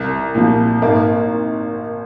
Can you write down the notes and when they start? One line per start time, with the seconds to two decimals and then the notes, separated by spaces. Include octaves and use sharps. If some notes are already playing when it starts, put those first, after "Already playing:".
Already playing: C2
0.35 A#2 F3
0.82 G#1 A#3